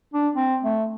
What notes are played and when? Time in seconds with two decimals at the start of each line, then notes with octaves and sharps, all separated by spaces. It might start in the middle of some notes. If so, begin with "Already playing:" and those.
0.14 D4
0.35 C4
0.64 A3